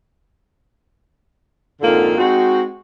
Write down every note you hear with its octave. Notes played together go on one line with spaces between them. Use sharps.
F2 G#2 D3 A#3 F4 A4
G#3 C4 D#4 F#4